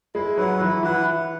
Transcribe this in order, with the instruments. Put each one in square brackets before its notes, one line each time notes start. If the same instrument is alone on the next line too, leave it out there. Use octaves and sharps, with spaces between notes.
[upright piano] G#3 [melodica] E4
[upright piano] F#3 [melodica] B4 F#5
[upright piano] F#3
[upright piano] E3 [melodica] E4
[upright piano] E3 [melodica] B4 F#5